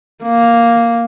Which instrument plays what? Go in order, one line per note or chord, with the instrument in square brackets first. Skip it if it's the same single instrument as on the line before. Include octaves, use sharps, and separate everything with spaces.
[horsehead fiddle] A#3